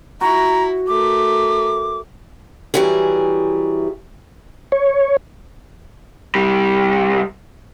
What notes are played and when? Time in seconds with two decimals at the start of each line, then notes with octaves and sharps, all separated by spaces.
0.21 E4 F#4 A#5
0.88 A3 A#4 D6
2.74 E3 F#3 G3 E4 G#4
4.72 C#5
6.35 C2 G3